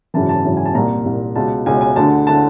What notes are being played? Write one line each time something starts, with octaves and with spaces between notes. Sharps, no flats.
G#1 F#2 C#3 E3 A5
A5
G#1 F#2 C#3 E3
G#5
A5
C2 A#2 A#5
C2 A#2
C#2 B2 A5
C#2 B2 G#5
G#5
D2 D3 A5
D3 A5